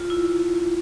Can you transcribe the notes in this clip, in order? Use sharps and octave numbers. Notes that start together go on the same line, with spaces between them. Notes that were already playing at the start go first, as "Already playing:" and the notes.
Already playing: F4
E4